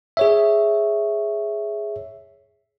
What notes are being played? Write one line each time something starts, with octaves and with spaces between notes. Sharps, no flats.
G#4 C#5 E5